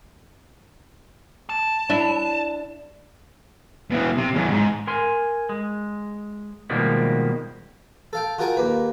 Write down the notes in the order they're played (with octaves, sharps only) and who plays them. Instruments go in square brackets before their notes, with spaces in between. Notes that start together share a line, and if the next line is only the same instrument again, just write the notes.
[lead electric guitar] A5
[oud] D4 E4
[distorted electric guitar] B2 E3
C3
E2 C#3
G#2
[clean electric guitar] A#4 G#5 C6
G#3
B2 D#3 F3 G3 G#3 A#3
[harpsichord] A4 F5 G5
F4 F#4 G#4 A#4 G5 G#5
D#2 A#3 B4